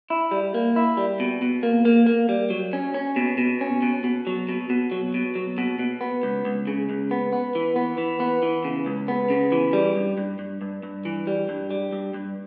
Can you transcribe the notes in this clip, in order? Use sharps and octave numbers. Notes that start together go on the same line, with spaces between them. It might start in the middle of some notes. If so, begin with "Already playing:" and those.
E4
G3
A#3
E4
G3
B2
B2
A#3
A#3
A#3
G3
F#3
C#4
C#4
B2
B2
C#4
B2
B2
F#3
B2
B2
F#3
B2
F#3
B2
B2
B3
C#2
C#2
C#3
C#2
B3
B3
E3
B3
E3
B3
E3
C#3
C#2
B3
C#3
E3
G3
G2
G2
G2
G2
G2
E3
G3
G2
G3
G2
G2